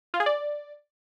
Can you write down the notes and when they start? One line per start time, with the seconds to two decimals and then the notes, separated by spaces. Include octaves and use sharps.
0.14 F4
0.20 G#4
0.26 D5